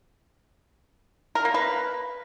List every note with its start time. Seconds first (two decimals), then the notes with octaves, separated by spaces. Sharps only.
1.35 A#4
1.45 A#3
1.54 B4